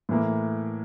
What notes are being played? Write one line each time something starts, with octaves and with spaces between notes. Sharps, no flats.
A2 E3 A#3